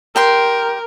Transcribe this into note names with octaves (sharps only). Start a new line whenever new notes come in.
G4 A#4 G5 C6